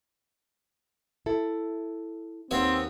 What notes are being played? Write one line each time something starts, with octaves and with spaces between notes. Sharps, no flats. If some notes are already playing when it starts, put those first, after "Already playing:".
E4 A4
D#2 B3 C4 C#5